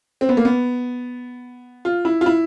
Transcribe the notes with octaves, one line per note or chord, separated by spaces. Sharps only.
C4
B3
A#3
B3
F4
E4
F4
E4